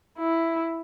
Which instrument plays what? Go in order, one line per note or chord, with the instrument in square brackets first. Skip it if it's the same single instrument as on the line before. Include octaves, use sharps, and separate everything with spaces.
[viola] E4